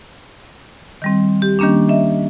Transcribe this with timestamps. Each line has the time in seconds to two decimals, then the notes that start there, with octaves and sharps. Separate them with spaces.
1.02 D#3 G3 C4
1.42 G4
1.59 D#3 G3 A#3 C#4 D4
1.88 D#5 E5